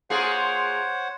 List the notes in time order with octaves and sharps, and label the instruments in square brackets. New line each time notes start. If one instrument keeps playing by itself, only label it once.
[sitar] A#3 F4 G#4 [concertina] C5 C#5 F#5